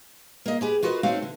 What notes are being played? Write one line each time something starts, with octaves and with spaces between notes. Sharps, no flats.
A#3 D#5
G4 G#4 B4
F4 F#4 A#4 B4 D5 D#5
A3 C4 C#4 D#4 F#4 F5
D3